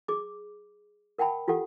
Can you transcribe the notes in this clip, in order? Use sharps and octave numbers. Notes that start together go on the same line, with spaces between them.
G#4 D6
A#4 F#5 G5 A5 B5
F4 G4 A4 F#5